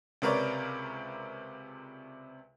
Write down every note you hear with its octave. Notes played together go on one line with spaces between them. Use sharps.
C#2 C3 A#4 B4 C#5 D5